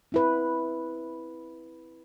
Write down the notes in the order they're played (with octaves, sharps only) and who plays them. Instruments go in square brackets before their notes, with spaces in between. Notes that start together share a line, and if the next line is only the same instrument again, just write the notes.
[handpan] C4 E4 B4